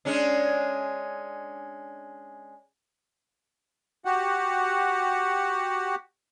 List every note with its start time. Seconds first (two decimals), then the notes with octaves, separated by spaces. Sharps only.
0.05 G#3 C#4 D4
4.05 F#4 G4 F#5